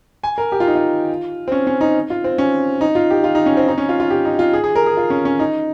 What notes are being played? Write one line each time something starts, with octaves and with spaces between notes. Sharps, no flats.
G#5
A#4
G4
F4
D#4
F4
C4
C#4
C#4
D#4
F4
C4
C#4
D#4
F4
G4
F4
D#4
C#4
C4
D#4
C#4
F4
F4
G4
D#4
F4
G#4
G#4
A#4
G#4
F4
C#4
C#4
D#4